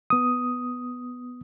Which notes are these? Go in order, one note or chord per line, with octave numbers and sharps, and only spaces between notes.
B3 D#6